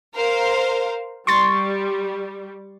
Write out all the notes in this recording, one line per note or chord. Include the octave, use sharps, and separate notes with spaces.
A#4 C5 F5
G3 C6 C#6 A6